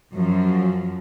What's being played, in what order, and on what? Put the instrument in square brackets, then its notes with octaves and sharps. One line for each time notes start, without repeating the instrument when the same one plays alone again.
[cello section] F#2 F3